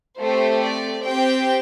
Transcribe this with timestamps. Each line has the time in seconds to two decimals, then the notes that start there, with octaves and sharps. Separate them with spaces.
0.18 A3 C4 G4 C5
0.62 D5
1.04 C4 G4 G5